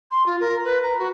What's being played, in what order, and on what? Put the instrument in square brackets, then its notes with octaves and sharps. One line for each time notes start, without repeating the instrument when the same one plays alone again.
[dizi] C6
F4
A#4
B4
A#5
F#4